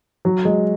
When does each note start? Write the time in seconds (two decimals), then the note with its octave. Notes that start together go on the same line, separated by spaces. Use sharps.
0.25 F#3
0.45 G#3